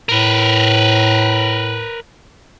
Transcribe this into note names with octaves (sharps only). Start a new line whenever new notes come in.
A2 A#4 B4